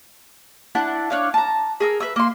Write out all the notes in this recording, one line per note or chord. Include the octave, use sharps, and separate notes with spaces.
D4 E4 F#5
D4 C#5 F5
A5 A#5
G#4 A#4 E6
B4 E5 E6
A#3 C6